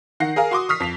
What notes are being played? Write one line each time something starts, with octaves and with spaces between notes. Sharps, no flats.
D#3 F#5 A#6 C7
G#4 A#4 F5
F#4 C6 D6 D#6
C#6 D#6 F6 B6 C7
F2 B6 F7